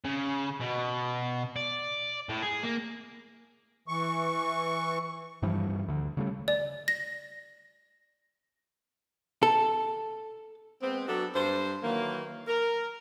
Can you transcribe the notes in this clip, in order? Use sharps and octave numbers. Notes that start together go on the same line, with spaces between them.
C#3
B2
D5
A2
G#4
A#3
E3 C#6
G2 E3 F3 G3
D2 D3
C#3 G3 A3
D5
A#6
A4
G#3 B3 C4
F#3 B3 D4 F#4 A4
G2 D4 C5
D#3 E3 F#3 A#3
A#4